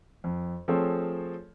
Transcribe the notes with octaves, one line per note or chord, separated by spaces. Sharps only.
F2
F3 A3 C4 G#4 A4 C#5